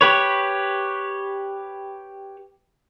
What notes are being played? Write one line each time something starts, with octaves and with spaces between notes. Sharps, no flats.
G4 B4 C#5